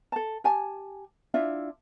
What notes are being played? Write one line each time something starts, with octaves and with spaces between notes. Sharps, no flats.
A4 A5
G4 G#5 A5
D4 E4 F4 E5